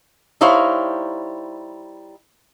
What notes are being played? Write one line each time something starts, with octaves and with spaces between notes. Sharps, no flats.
G3 D#4 E4 C5 C#5 F5